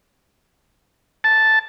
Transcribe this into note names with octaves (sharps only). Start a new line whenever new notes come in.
A5